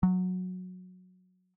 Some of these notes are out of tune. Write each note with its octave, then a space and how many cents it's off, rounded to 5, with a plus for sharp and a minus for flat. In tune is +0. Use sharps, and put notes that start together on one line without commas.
F#3 -15